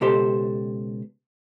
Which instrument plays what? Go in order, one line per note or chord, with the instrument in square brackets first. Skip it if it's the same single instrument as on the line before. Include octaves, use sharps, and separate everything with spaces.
[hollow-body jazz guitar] C#2 B2 G4 A4 C5